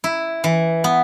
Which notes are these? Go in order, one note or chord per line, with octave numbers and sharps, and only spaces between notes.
E4
E3
B3